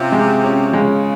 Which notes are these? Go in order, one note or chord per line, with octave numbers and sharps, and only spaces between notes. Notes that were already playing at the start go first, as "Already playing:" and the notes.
Already playing: C3 C#4 F4
G#3
C#4
C#3 G#3